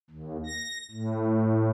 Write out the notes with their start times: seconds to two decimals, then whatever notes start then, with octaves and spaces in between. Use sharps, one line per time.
0.10 D#2
0.46 A#6
0.91 A2